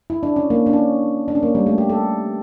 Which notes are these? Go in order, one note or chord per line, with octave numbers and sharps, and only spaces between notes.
E4
D4
C#4
A#3
D4
C#4
D4
C#4
A#3
G3
A3
G4
A4